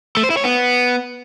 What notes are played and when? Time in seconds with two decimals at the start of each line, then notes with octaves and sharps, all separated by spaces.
0.17 A3
0.24 C5
0.30 E4
0.37 C#5
0.44 B3